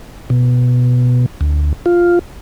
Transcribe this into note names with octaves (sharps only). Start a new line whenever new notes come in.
B2
D2
F4